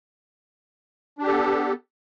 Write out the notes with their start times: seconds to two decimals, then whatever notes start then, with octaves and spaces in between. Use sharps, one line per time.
1.18 D4
1.23 G4
1.27 A4
1.32 B3